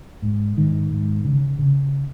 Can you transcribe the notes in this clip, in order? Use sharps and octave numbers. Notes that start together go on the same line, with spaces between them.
G#2
G#2 D#3
G#2
C#3
C#3